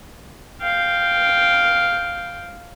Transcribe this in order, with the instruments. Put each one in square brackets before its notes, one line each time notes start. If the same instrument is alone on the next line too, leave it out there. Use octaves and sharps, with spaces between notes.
[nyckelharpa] F5 G5